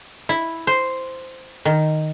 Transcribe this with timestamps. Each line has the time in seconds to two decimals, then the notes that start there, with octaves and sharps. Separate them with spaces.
0.29 E4
0.67 C5
1.65 D#3